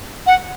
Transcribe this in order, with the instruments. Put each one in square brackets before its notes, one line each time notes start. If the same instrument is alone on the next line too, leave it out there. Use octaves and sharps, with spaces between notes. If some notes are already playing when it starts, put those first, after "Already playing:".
[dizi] F#5